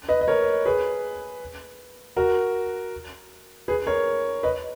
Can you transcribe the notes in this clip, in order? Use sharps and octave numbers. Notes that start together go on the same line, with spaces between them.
B4 D#5
D#5
A#4 C#5
G#4 B4
F#4 A#4
G#4 B4
A#4 C#5
B4 D#5